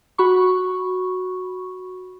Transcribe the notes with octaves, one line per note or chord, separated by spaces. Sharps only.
F#4 B5 C#6